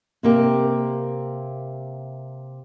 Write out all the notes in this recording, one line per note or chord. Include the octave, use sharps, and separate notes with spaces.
C3 A#3 G4